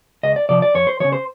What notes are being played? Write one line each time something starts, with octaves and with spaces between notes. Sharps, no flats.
C#2 D#5
D5
C3 F3 D5
D5
F2 C#5
C5
C#3 F3 C#5
C5